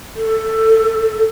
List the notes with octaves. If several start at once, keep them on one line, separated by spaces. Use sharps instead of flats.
A4